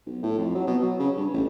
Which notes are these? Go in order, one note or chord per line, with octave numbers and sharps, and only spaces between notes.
B1
A2
F2
F#3
B2
F#3
C#3
G2
A1